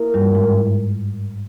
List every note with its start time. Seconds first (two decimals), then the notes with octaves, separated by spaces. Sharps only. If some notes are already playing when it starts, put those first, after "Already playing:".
Already playing: A#3 E4 A#4
0.14 G2 G3
0.35 G#2 G#3